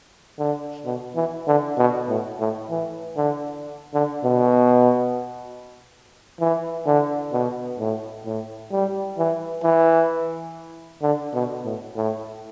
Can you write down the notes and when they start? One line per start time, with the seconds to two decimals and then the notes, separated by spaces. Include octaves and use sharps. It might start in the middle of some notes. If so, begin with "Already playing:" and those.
0.39 D3
0.86 B2
1.16 E3
1.47 D3
1.78 B2
2.08 A2
2.40 A2
2.71 E3
3.17 D3
3.94 D3
4.24 B2
6.40 E3
6.86 D3
7.33 B2
7.79 A2
8.25 A2
8.71 G3
9.18 E3
9.64 E3
11.02 D3
11.34 B2
11.65 A2
11.96 A2